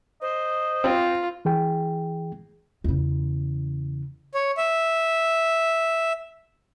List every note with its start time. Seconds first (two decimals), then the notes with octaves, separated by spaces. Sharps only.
0.22 C5 D#5
0.84 C4 F4
1.45 E3 G#4 G5
2.84 E2 C#3
4.34 C#5
4.57 E5